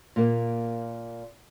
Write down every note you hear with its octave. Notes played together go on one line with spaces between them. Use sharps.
A#2 A#3